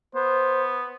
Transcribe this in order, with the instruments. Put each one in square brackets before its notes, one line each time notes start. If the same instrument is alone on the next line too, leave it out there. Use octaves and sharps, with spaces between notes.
[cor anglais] B3 [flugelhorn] C5